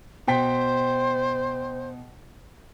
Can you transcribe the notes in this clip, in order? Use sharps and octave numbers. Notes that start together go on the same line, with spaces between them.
B2 C5 G5 B6